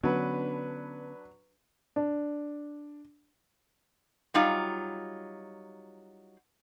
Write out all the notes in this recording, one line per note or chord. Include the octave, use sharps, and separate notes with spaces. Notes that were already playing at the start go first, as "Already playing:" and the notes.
D3 F#3 B3 C#4 D4 B4
D4
F#3 G3 D#4 F4